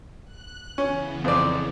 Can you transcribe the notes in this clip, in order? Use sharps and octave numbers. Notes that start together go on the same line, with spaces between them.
F#6
C#3 E3 B3 C#4
F2 C4 D5